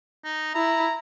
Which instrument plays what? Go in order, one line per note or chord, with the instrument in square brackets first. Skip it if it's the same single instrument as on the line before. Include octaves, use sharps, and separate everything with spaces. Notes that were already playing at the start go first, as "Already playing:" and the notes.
[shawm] D#4
[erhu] E4 [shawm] A#5